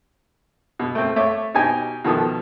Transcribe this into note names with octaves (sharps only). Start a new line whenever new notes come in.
B2
A3 C4
A3 C#5 E5 D6
B2 D#4 G4 G#5
B2 D#3 F3 B3 A4 D#6